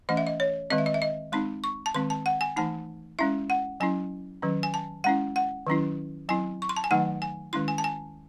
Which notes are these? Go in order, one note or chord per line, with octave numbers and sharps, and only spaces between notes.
E3 A3 C#4 D#5
E5
D#5
C#5
D#3 G#3 C4 D#5
E5
D#5
E5
D#5
G#3 C4 D#4 C6
C#6
A5
D#3 G#3 C4 C6
A5
F#5
G#5
E3 A3 D#4 A5
G#3 C#4 E4 E5
F#5
F#3 C#4 E4 G#5
D#3 F#3 C#4
G#5
A5
G#3 C#4 E4 F#5
F#5
D#3 F#3 C#4 E4
F#3 C4 E4 G#5
C#6
C6
A5
G#5
D#3 F#3 A3 D#4 F#5
G#5
D#3 G#3 C#4 E4 C6
G#5
A5
G#5